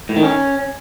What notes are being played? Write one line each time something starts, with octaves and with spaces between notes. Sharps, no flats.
A2
D#3
C#4